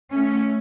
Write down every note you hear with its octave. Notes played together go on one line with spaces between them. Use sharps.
A3 C#4